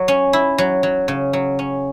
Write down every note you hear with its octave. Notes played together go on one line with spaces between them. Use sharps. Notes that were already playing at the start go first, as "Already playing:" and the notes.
Already playing: F#3
C#4
E4
F#3
F#3
C#3
F#3
C#4